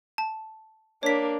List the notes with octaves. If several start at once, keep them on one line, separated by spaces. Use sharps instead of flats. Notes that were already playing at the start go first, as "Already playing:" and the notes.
A5
A#3 D4 C#5 B6